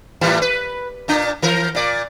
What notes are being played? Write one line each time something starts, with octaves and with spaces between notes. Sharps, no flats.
A2 E3 G3
B4
A#2 D4
E3 A#4
A#2 D5